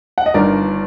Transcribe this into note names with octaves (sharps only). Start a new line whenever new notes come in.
F#5
D#5
G1 G2 D#3 A#4 D5